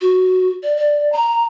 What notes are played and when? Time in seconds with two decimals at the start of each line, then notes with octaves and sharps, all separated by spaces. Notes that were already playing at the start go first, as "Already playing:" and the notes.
0.01 F#4
0.63 D5
0.77 D5
1.12 A#5